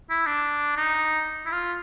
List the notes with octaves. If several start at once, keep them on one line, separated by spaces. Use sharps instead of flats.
E4
D4
D#4
E4
F4